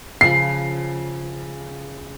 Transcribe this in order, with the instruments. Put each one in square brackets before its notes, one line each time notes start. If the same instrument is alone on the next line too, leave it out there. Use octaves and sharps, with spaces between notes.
[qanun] C#3 F3 B5 [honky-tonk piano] C7